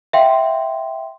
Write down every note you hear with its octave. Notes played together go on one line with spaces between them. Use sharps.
E5 F5 G5 C6